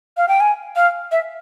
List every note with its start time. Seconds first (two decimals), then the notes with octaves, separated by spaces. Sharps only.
0.17 F5
0.28 G5
0.40 G#5
0.76 F5
1.12 E5